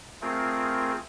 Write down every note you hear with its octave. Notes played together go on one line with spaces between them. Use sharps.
A3 C4 F4 G#4 A#4